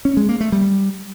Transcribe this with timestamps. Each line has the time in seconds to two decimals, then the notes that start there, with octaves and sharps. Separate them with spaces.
0.05 C#4
0.17 G#3
0.29 A#3
0.41 A3
0.52 G3